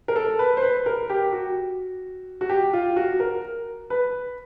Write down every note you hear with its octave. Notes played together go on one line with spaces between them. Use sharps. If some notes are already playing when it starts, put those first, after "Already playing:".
A#4
A4
B4
C5
B4
A#4
G4
F#4
F#4
G4
F4
F#4
A#4
B4